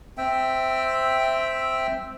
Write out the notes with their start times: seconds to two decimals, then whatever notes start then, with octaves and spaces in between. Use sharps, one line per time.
0.17 C4 E5 G5